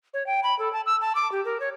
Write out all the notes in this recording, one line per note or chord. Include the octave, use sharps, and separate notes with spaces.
C#5
G5
B5
A4
A5
E6
A5
D6
G4
A#4
C#5